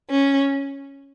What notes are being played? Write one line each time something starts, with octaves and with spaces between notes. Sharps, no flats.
C#4